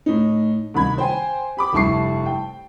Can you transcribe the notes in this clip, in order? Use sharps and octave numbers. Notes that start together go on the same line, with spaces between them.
A2 D#4
C2 D#3 B5 G#6
C5 G5 G#5
G4 B5 D6
F1 G2 E4 A5 C#6 C7
G5